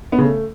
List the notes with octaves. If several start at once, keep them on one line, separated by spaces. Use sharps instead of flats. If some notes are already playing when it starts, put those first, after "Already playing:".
B3
C#3
A3